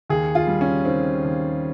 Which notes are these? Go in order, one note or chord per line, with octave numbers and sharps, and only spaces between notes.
D#2 G#4
F4
G3
C#4
D#3 C4
D#2